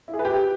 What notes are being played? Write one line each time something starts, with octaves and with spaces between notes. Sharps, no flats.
E4
G#4
B4
G4